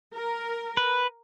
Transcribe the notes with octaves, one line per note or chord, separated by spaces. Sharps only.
A#4
B4